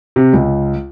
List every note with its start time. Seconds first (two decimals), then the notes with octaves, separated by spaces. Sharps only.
0.16 C3
0.34 C#2